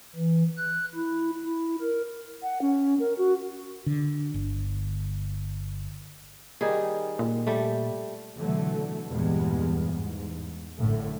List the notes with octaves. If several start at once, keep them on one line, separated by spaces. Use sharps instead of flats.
E3
F#6
E4
E4
A#4
F#5
C#4
A#4
F#4
D3
G1
D#3 G3 G#4
A#2
G3 A3
B2 D3 E3 F#3 A3
E2 G2 A#2 G3 G#3 B3
E2 G#2
A1 F#2 A2 D3 A3